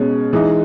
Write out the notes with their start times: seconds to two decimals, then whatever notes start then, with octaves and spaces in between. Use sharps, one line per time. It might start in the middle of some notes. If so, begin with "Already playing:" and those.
Already playing: B2 G#3 C#4
0.33 E3 G#3 D#4